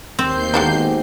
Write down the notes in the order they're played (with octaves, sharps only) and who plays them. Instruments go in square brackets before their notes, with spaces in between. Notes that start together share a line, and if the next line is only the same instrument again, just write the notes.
[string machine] D#2 G6 C7 [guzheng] C4
[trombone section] G#2 B2 G4 [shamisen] D3 A#3 D4